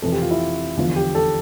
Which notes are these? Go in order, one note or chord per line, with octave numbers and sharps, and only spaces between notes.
F2 C3 E3 A4
G4
F4
E4
E2 D3 F3 F4
G4
A4